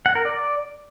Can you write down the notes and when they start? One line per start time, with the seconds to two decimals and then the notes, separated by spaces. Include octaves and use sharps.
0.06 F#5
0.15 A#4
0.25 D5